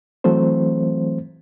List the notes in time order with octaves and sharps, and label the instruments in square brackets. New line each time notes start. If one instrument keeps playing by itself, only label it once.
[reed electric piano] E3 F#3 A3 C4 C5